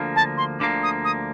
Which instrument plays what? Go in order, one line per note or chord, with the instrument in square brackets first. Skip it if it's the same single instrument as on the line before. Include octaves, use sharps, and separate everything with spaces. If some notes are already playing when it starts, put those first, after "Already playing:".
Already playing: [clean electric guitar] D2 D3 F3 A#3
[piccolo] A5
C6
[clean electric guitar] D2 D3 F3 A#3 [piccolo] D6
[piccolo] D#6
D#6